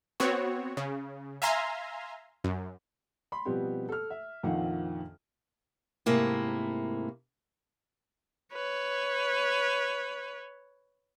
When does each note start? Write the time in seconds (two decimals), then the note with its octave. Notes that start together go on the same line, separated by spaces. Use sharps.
0.20 B3 C4 F#4 C#5
0.77 C#3
1.42 E5 F5 G#5 A#5 C6
2.44 F#2
3.32 B5 C6
3.45 B2 F3 G3 B3 C4 G4
3.89 A4 F6
4.10 E5
4.43 A#1 F2 D#3 F4 F5 F#5
6.06 G#2 C3 A3 A#3 E4
8.53 B4 C#5